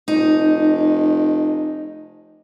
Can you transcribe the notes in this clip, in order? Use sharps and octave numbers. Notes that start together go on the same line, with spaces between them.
F1 D#4